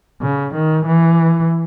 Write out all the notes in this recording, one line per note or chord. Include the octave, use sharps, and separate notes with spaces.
C#3
D#3
E3